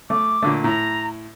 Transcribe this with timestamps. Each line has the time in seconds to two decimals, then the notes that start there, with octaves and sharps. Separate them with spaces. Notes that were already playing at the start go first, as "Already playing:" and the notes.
0.10 A3 D6
0.43 A#2 D3 A3
0.64 A2 A#5